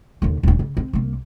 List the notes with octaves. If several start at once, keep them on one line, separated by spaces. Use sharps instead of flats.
D#2 D3
D#1 D4
C#3
C4
C2 A#3